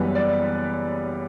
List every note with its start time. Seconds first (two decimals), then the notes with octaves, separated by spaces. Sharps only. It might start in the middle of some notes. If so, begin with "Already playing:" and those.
Already playing: F#1 F#2 E3 G3 B3 B4
0.15 D5